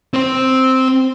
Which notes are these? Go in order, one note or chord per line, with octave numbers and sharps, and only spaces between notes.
C4 C5